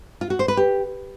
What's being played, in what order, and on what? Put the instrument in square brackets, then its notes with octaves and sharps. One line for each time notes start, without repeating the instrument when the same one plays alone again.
[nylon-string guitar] F4
F#4
C5
B4
G4